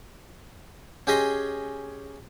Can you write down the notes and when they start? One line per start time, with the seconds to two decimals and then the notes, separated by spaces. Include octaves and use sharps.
1.07 C#4 G4 G#4 D#5 G#5 C6